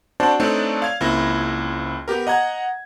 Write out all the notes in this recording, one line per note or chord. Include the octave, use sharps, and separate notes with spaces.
C4 D4 F#4 C5 D5 A5
A3 C4 D4 D#4 C#5 D5
F5 G#6
C#2 A#3 C4 E4 A#6
B3 G4 A#4
D#5 F#5 A#5 G#6